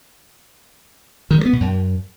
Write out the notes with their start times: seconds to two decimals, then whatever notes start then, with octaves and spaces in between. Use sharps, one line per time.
1.31 D#3
1.38 G3
1.46 B3
1.53 B2
1.60 F#2